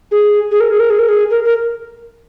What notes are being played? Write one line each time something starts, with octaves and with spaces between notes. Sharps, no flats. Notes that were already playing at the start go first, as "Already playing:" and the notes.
G#4
G#4
A#4
G#4
A#4
G#4
A#4
G#4
A#4
A#4